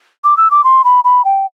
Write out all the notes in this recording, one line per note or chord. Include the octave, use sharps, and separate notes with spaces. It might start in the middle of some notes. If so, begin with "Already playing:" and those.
D6
E6
D6
C6
B5
B5
G5